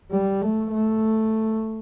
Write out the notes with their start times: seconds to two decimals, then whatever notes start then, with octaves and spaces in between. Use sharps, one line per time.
0.11 G3
0.42 A3
0.72 A3